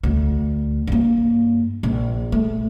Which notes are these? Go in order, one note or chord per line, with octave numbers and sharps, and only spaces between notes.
D2
G2 A#3
A#1
A3